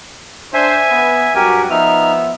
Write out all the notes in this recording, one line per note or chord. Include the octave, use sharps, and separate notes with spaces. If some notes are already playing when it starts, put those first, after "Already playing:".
D4 C5 E5 G#5
B3
G2 F#3 F#4 G4 A#4 G#5
F3 B3 D#4 E5 F6